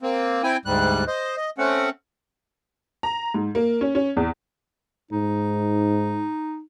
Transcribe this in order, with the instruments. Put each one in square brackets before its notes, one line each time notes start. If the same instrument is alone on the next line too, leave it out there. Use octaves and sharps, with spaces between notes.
[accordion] A#3 C4
C4 E4 G5 G#5
D2 G#2 G3 F#6
C5 D#5
D#5
A3 C4 C#4 F#5
[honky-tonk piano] A#5
G#2
A#3
C#4
C#4
E2
[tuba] G#2 [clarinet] D#4